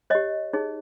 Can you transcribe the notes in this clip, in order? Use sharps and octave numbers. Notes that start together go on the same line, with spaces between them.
G4 C#5 D#5
D#4 G#4 C#5